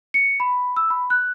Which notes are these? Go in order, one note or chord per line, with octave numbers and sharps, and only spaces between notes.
C#7
B5
E6
B5
F#6